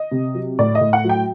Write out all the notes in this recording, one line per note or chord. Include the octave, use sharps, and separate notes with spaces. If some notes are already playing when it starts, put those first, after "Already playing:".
Already playing: D#5
C3
F#3
A2 D5
D#5
A2
F#5
F#3
G5